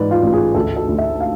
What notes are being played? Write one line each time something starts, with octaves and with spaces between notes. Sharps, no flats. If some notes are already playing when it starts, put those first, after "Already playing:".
Already playing: G#2 E3 B4 D5
F4
A1
G#4
D2 A4
A4
D2
E5
F5